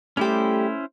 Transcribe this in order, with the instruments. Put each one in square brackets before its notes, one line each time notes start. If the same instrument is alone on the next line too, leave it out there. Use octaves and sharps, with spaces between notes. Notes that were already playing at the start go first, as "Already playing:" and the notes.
[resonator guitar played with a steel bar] G3 G4 [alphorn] A3 [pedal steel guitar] C#4 E4 C5